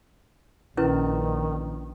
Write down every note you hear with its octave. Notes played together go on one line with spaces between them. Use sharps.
A#1 D#3 C#4 E4 B4